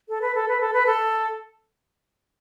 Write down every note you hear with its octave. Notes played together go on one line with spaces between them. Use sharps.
A4
B4
A4
B4
A4
B4
A4